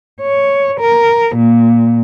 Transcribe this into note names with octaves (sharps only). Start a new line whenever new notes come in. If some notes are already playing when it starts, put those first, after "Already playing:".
C#5
A#4
A#2